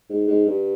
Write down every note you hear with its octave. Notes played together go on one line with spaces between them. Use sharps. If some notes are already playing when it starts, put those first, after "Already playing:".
G#2
G#2
G2